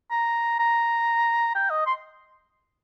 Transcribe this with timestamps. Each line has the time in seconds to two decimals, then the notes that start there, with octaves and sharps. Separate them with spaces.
0.11 A#5
0.59 A#5
1.55 G5
1.70 D#5
1.86 C6